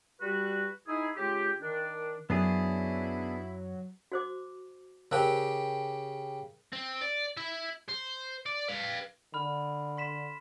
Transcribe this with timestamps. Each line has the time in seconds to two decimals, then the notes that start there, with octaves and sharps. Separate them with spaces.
0.21 G3 F#4 B4
0.88 D#4 E4 G#4
1.17 C#3 G#3 F4 G4
1.62 D#3 D4
2.30 F#2 F#3 B3 D4 E4 G#4
4.12 F#4 C5 D6
5.12 C#3 G4 A#4 C5 A5
6.73 C4
7.02 D5
7.37 E4 E5
7.89 C5
8.46 D5
8.69 B4 F5
9.34 D3 B5 F6
9.97 C6 B6 E7